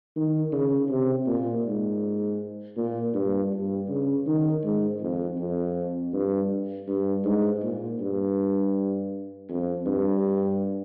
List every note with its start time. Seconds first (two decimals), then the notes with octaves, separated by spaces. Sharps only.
0.16 D#3
0.52 C#3
0.90 C3
1.27 A#2
1.66 G#2
2.77 A#2
3.14 G2
3.52 G2
3.89 C#3
4.26 D#3
4.63 G#2
5.01 F2
5.38 F2
6.13 G2
6.88 G2
7.25 G#2
7.63 A#2
8.00 G2
9.49 F2
9.86 G2